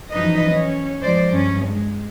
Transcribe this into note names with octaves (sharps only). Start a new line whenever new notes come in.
F#2 E3 F3 D#4 B4 D#5
C#4
F3 G#3 C5 D5
G2 C#4
G#3